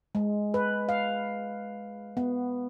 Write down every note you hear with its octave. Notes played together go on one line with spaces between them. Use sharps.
G#3
B4
F5
B3